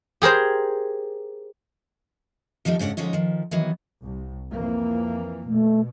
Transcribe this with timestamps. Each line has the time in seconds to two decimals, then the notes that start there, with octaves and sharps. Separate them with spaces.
0.22 G4 G#4 A#4 C5
2.65 D#3 F3 G3 A3 D#4
2.79 G#2 C#3 C#4 D4 F#5
2.97 D3 F3 G#3 C#4 D#4
3.13 D#3 F3
3.51 D#3 E3 F#3 B3
4.05 C2
4.50 F2 E3 A#3
5.47 B2 A3